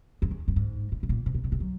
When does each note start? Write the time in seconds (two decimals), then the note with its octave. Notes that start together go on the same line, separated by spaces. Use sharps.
0.22 F2
0.31 E2
0.48 G2
0.56 G#2
0.92 A2
1.03 A2
1.09 A#2
1.26 B2
1.34 A#2
1.44 B2
1.52 C3
1.60 F#3